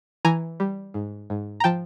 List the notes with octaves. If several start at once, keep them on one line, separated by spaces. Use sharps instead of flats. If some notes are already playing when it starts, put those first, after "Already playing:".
E3 G#5 A#5
G3
G#2
G#2
A#5
F3 G5 A5